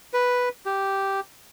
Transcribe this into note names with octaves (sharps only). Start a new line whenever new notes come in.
B4
G4